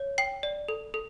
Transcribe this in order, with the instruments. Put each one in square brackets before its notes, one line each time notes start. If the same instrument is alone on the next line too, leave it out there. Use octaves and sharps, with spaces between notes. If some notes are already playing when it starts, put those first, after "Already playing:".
Already playing: [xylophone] C#5
G5 C7
D5
A4
A4